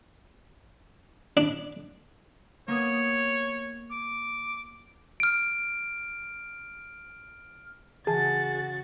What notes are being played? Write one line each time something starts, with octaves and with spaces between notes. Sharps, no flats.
D4
A#3 B3 C#5 D#6
D6
F6 D7
C#3 E3 F#4 G#4 A5 A6